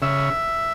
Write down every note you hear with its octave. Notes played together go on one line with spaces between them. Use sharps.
C#3 E5